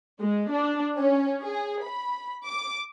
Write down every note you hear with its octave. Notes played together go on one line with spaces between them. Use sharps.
G#3
D4
C#4
G#4
B5
D6